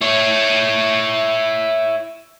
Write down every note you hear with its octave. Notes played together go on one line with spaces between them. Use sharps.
E4 C#5